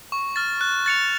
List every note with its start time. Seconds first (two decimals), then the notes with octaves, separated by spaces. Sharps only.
0.12 C#6
0.36 F6 A6
0.61 F#6
0.86 A6 C#7 F7